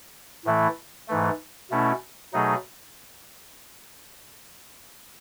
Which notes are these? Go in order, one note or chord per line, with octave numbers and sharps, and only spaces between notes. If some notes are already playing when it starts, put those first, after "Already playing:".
A2 E3 A3 E4
G#2 E3 A3
B2 A3 C#4 E4
B2 F#3 A3 D#4 G#4